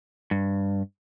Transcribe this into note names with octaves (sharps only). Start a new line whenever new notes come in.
G2